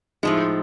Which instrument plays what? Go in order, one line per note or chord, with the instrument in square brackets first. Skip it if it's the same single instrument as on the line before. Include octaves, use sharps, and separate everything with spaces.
[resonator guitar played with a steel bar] A2 F3 G#3 [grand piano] D#4